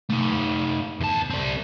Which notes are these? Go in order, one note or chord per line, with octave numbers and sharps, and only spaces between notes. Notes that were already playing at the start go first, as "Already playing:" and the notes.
A3 D#4
E2 A5
G3 C4